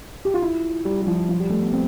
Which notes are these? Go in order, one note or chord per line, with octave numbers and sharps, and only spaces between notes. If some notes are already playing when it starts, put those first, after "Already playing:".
G4
F4
E4
G3
G3
F3
F3
G3
A3
B3
C4